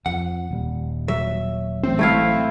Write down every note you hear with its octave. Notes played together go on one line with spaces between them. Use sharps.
F2 F#5
D#1 G3
F#3 E5
A1 A2 C4
A3 E4 F5